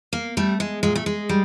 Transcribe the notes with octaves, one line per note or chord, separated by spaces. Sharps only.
A#3
G3 A3
G#3
A#2 G#3
A3
G#3
G3